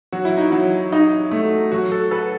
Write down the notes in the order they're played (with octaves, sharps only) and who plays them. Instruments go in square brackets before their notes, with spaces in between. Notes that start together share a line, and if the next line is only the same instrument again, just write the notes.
[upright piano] F#3 [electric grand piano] F#4
[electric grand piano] E4
D#4
[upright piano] F#3 [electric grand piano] E4
[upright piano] D#4
A3
[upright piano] F#3 [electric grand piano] F#4
[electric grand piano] A4
[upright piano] A4 [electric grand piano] B4